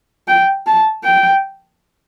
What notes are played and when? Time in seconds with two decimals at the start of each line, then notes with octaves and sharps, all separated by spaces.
0.28 G5
0.67 A5
1.05 G5